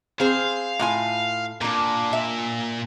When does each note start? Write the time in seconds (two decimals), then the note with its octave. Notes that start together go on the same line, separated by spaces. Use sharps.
0.20 C4 G#4 C5 F5
0.79 A2 F4 G#5
1.61 A#2 A#3 D4
2.13 E5